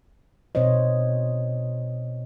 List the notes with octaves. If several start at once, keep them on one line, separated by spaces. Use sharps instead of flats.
B2 C4 C5 C#5 D#5